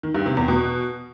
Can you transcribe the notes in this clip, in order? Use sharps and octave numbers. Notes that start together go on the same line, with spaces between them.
D#3
G2
C3
E2
B2